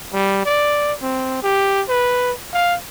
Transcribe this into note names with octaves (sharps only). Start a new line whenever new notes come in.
G3
D5
C4
G4
B4
F5